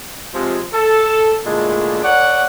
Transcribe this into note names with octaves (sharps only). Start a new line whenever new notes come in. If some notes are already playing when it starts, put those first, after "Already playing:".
C3 F3 G#3
A4
A#2 D3 G#3 A3 D4 E4
A#4 C#5 D5 F#5